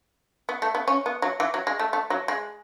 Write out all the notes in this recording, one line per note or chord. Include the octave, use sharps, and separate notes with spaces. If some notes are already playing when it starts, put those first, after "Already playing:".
B3
A3
B3
C#4
B3
F#3
E3
F#3
G#3
A3
A3
F#3
G#3